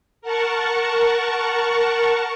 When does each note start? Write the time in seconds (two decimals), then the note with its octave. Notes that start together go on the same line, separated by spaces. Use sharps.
0.21 A#4 F#5 A5 C#6